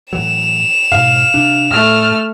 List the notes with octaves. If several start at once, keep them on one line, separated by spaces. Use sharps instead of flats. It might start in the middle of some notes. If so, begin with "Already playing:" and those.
A2 E3 F#3 E7 F7
G#2 B2 F5
C3 D4
A2 A3 F6